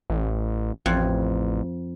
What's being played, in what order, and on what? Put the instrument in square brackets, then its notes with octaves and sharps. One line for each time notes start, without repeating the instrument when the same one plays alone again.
[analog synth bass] A1
[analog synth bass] A1 [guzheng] F2